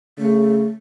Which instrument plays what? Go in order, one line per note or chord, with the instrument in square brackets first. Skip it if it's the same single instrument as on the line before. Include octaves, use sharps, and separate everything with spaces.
[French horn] C#3 [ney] A3